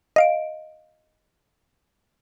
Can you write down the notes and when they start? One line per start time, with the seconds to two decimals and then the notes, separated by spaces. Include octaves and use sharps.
0.16 D#5 F5 D7